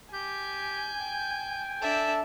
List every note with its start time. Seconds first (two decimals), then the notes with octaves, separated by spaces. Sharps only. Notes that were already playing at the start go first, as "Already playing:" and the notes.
0.13 G4 G#5 G6
1.00 G5
1.82 D4 A4 E5 A5